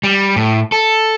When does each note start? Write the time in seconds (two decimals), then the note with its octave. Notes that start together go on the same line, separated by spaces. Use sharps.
0.03 G3
0.36 A2
0.72 A4